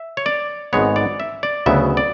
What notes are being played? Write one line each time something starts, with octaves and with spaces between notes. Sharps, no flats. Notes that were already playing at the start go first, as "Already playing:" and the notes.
Already playing: E5
C#5
D5
G#1 G#2 G#3 B3 C#5
D5
E5
D5
D2 C#3 F#3 B3 E5
D5